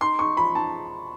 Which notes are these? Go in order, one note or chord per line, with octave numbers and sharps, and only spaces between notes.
D#4 C6
D#4 C#6
F3 B5
D#4 A5